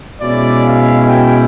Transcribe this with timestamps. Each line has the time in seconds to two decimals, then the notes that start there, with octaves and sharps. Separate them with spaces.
0.21 B2 G#3 C#4 E4 D5
0.65 F5
1.08 G5